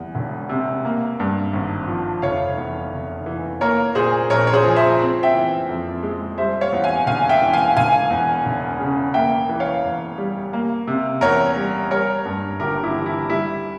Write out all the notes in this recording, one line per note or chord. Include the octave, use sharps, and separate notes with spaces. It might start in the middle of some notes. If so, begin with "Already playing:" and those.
Already playing: E2 G3
E1
C3
A#3
G2
G#1
F3
F1 C#5 F5
E2
F1
E3
A#3 A#4 C#5
A#2 G#4 C5
A#1 A#4 C#5
C#5
G#4 C5
F3
C5 E5
C4
E5 G5
E3
F2
G#3
G3 C5 E5
C#5 F5
E2
F5 G#5
E1 F5 G#5
E5 G5
E3
F5 G#5
E1 F5 G#5
E2
E1
C#3
A#3 E5 G5
E3
C#5 F5
E2
G3
A#3
C3
E2 A#4 C#5
G3
G3 A#4 C#5
G2
G1 G4 A#4
E4 G4
E3
E4
G3 E4